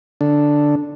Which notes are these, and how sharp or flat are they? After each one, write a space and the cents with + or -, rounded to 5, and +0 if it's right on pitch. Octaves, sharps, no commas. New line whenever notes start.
D3 +0 D4 +0